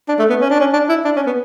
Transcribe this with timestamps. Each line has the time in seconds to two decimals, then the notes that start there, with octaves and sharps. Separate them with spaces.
0.08 D4
0.19 A3
0.30 B3
0.41 C#4
0.50 D4
0.60 C#4
0.73 D4
0.89 E4
1.05 D4
1.16 C#4
1.26 B3